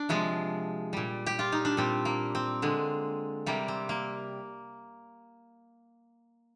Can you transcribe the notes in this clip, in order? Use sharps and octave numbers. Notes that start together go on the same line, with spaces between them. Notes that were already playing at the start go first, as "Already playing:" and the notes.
Already playing: D4
C3 F3 G#3
A#2 G3
G4
F4
D#4
D4
A#2 G3 C4
A#3
C4
D3 G#3
C3 G3 A#3
C4
A#3